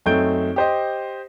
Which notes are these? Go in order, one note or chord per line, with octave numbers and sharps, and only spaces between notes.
F#2 A3 C4 D#4 G6 D7
G4 C5 D#5